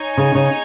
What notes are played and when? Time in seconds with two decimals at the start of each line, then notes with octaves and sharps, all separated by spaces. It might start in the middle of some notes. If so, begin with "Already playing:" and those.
Already playing: D#4 C#5 G#5
0.17 C#3
0.35 C#3